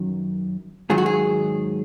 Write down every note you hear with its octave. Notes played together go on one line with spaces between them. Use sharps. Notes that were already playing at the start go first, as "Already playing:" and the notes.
Already playing: F#2 D#3 F#3
G#2 D#3 F#3 G#4
F#4
G#4